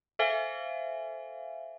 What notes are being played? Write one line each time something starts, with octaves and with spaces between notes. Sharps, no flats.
A4 C5 E5 F5 G#5